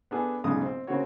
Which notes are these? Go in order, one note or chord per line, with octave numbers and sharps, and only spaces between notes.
B3 D4 G#4 A4
B1 G#2 C#3 D4 D#6
C4
C#3 A#3 C4 F#4 C#5